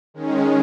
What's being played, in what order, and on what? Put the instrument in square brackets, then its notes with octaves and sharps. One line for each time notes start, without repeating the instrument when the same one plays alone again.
[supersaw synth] D#3 G#3 C#4